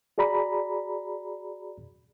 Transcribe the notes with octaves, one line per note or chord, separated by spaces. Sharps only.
F#4 G#4 D5 A#5 B5